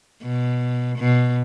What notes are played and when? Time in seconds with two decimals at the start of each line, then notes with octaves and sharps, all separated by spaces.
0.23 B2
0.99 B2